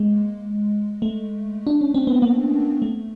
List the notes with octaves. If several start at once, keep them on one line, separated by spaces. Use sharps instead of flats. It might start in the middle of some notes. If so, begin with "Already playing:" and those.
Already playing: G#3 A#3
A3
D4
C#4
C4
B3
A#3
A3